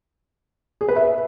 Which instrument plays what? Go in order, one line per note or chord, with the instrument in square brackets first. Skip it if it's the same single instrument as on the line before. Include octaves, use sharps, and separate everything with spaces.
[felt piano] G#4
B4
E5